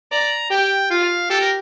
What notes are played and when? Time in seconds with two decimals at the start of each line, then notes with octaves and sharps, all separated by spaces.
0.11 D5 A#5
0.50 G4 G5
0.91 F4 F5
1.30 G4 A4
1.41 A#4